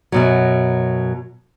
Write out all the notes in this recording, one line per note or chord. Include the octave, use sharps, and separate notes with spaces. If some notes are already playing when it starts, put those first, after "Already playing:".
F#2 B2 F#3